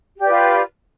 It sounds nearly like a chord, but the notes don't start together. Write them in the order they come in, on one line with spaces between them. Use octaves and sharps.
G4 D5 B4 F4